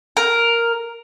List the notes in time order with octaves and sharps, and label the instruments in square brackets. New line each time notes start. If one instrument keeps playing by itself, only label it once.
[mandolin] A#4